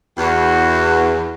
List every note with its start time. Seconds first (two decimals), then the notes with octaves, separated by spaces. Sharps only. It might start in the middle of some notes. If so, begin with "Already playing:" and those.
0.18 E2 F#4